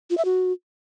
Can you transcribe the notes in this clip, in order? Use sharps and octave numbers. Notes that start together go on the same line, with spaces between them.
F4
E5
F#4